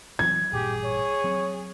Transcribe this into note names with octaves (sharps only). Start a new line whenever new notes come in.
E3 F#3 C4 G#6
A1 G2 A#2 G4 G#4
C#5
F#3 C4